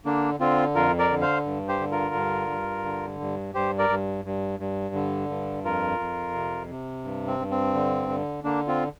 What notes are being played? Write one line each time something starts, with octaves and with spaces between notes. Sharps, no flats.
D3 A#3 D4
D3 C4 F4
F2 F4 A#4
A#4 D5
D3
C5 F5
G2
G4 C5
D3
F4 A#4
G2
G2
D3
G2
G2 G4 C5
A#4 D5
G2
G2
G2
D3
G2
F2 F4 A#4
F2
C3
C3
G2
C4
G2
C4
D3
D3
D3 A#3 D4
C4 F4